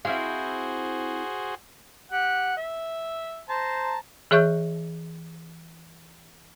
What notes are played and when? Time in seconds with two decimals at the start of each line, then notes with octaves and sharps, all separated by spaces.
0.05 C4 E4 F#4 G#4 C5 F5
2.12 G4 F#5
2.57 E5
3.49 C5 A5 A#5
4.31 E3 G#4 C#5 E5 C#6 G6